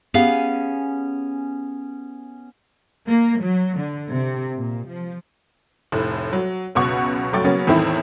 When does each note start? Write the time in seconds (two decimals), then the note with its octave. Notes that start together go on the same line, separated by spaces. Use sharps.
0.14 B3 C#4 G4 G#4 F5
3.07 A#3
3.41 F#3
3.77 D3
4.10 C3
4.58 A#2
4.88 F3
5.92 F1 A2 F#6
6.33 F#3
6.75 C#2 F#2 B2 F#5 C#6
7.33 F#1 F#3 A3 G5 C#6 A6
7.44 C#3 F#3 A#3 B3 C#4
7.67 E2 A2 D#3 E3 C4 E4